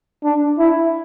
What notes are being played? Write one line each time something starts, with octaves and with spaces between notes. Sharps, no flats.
D4
E4